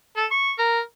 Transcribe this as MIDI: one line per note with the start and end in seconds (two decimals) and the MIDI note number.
0.17 0.25 69
0.31 0.52 85
0.59 0.80 70